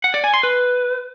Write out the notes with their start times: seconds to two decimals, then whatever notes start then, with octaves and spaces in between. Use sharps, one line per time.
0.04 F#5
0.14 D5
0.24 G#5
0.34 C6
0.43 B4